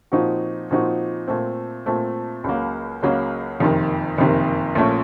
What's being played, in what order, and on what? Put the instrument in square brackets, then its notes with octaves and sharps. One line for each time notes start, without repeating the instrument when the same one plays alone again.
[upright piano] A#2 F3 C4 D#4 F#4
A#2 F3 C4 D#4 F#4
A#2 A3 C4
A#2 A3 C4
C#2 C#3 F#3 A#3
C#2 C#3 F#3 A#3
F#1 F2 C3 D#3
F#1 F2 C3 D#3
A#1 A#2 A3 C#4